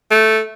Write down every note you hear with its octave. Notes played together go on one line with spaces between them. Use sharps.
A3